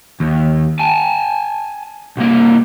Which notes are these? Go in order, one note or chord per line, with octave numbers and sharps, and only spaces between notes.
D#2
G#5 A5
C2 A#3